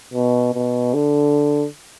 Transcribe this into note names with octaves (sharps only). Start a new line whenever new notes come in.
B2
B2
D3